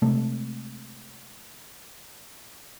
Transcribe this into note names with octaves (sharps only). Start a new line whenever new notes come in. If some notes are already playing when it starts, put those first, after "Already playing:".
C3 G#3 A3